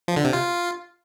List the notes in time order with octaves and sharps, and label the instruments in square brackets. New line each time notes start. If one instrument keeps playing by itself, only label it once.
[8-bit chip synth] F3
D3
C3
F4